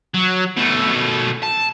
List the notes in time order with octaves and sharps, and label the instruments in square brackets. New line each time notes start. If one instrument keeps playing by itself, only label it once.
[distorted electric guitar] F#3
B2 A3
A5